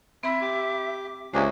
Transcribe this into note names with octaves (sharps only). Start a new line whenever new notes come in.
C4 E5 B5
G4 D6
C#2 A#3 D4 G4 C5 E5 G#5